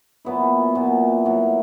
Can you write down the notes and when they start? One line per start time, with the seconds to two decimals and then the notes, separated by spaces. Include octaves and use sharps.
0.25 A#2 F#3 B3 E4
0.75 A#2 F#3 B3 E4
1.25 A2 F#3 A#3